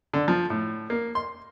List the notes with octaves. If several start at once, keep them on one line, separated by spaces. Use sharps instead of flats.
D3
F3
A2
A#3
C6